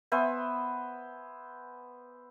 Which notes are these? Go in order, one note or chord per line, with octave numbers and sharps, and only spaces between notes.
B3 C5 E5 G#5